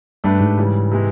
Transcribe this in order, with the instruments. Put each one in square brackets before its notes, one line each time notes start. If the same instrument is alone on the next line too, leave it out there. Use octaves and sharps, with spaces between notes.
[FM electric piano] G2 [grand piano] A3 D4 G4 B4
[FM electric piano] G#2
[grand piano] C#3 E3 G3
C3 E3 G#3